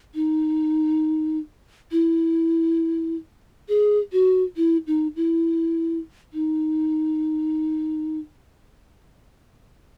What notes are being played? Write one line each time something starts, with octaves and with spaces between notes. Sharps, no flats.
D#4
E4
G#4
F#4
E4
D#4
E4
D#4